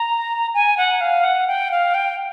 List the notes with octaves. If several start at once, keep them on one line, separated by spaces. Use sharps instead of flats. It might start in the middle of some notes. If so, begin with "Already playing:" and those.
Already playing: A#5
G#5
F#5
F5
F#5
G5
F5
G5